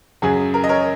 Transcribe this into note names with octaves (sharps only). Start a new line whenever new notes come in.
F#2 C#3 F#3 G#4
A#4
D#5
A#4 C#5